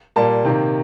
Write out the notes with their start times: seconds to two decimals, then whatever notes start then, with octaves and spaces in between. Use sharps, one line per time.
0.16 A#2 G3 A#3 A5
0.45 C3 D#3 A#3